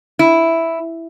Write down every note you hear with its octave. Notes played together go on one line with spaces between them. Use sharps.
E4